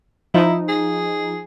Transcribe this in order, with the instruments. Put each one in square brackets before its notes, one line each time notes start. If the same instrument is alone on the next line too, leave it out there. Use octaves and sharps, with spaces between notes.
[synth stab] F3 D#4 [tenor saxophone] E4
[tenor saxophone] G#4